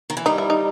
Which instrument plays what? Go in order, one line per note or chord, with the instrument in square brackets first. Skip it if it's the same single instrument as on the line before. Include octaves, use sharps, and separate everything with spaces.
[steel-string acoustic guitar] D#3
E3
[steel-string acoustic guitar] G3 [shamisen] D#4
[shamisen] E4
D#4